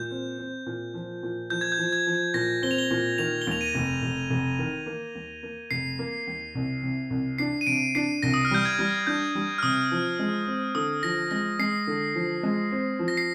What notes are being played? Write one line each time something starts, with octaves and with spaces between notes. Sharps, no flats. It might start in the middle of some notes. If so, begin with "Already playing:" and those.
Already playing: A#2 G6
C4
C4
A#2
F3
A#2
F3 G6
G#6
G6
F3
G#6
F3
A#2 A#6
C4 G7
F7
G7
A#2
D#3 F7
G7
D#2 F7
D#7
F1
F1
F1
D#3
A#3
D#2
A#3
F1 C7
A#3
D#2
C2
C3
C2
D4 C7
D#7
C3 D7
D4 C7
C2 A#6
D#6
F6
G3 G6
G#6
G3
D4 G6
G3
F6
C3 D#6
F3
G#3
C4
D3 D#6
F3 A#6
G#3 A#6
G#3 C7
D3
F3
G#3
C4
F3
A#6
C7